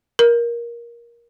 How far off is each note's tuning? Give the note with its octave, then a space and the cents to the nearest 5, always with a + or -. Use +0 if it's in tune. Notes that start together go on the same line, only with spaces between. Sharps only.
A#4 +15